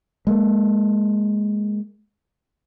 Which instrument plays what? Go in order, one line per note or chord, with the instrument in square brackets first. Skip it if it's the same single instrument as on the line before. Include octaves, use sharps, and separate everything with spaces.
[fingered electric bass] G#3 A#3